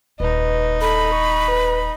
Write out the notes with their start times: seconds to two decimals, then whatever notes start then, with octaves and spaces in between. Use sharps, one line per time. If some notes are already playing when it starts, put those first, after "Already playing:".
0.20 D#1 D#4 B4
0.81 A4 B5
1.12 C#6
1.48 B4